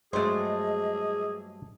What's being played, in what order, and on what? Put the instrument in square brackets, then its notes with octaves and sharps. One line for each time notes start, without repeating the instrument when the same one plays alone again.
[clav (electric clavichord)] G2 F#3 G#3 [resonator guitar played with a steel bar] A3 C5 [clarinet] G#4 [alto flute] D#5